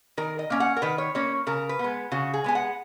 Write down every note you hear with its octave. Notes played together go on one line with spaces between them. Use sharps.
D#3 A#4
D#5
A#3 C#4
F#5
A#4
D#3 B4
C#5
A#3 C#4 C#5
C#3 A#4
B4
G#3 B3
C#3 F#4
G#4
G#3 B3 G#5
F#5